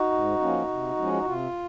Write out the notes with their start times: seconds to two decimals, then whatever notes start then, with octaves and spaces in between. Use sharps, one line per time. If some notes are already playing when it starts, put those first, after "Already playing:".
Already playing: D#4 F#4
0.12 G#2
0.40 F3 A#3 C#4
0.68 C3
0.97 F3 G#3 C#4
1.13 D#4
1.25 C3 F4